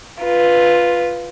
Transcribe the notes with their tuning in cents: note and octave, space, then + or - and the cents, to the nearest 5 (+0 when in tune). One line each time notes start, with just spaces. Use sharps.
F4 +0 B4 +0